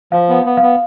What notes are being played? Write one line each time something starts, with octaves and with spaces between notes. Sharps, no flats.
F3 F5
B3
B3
F5
B3